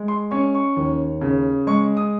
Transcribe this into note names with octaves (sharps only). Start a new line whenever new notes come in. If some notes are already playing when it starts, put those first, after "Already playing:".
Already playing: G#3
C6
C#4 C#6
C#6
D#2
C#3
G#3 C#6
D#6